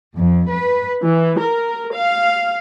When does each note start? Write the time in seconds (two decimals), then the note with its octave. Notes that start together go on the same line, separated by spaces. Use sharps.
0.16 F2
0.50 B4
1.03 E3
1.39 A#4
1.93 F5